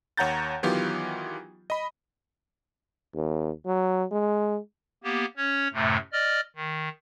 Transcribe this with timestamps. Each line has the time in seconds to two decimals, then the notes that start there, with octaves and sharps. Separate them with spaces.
0.17 D#2 C#5 F#5 A#5 G6 A6
0.63 D#3 E3 F#3 B3 F4 G4
1.70 D#5 B5
3.14 D#2
3.66 F#3
4.11 G#3
5.04 A#3 B3 G4
5.37 C#4 C#5
5.73 F#2 A2 C3 A3
6.12 D5 D#5 F6
6.56 D#3